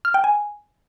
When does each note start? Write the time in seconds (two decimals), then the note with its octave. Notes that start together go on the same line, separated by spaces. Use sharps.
0.05 F6
0.14 G5
0.24 G#5